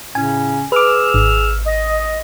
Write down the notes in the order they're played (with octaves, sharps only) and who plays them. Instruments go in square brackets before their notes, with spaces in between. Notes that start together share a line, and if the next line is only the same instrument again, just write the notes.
[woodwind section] A2 C#3 C#4 [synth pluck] G#5
[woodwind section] G#4 E6 F6 [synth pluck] B4 D6
[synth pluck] G#1
[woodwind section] D#5